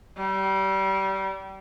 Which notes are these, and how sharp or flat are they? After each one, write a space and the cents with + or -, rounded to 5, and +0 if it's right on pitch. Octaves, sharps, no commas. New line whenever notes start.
G3 -25